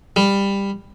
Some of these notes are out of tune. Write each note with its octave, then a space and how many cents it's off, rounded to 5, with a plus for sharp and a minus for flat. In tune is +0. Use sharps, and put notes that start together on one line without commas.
G3 +15